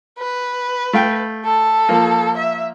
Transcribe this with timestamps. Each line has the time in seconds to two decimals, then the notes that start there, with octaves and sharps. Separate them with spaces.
0.19 B4
0.93 A3 F5 G5
1.45 A4
1.89 F3 A#3
2.37 E5